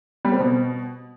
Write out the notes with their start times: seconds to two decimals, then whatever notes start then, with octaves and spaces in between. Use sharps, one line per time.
0.25 G3
0.32 C4
0.40 B2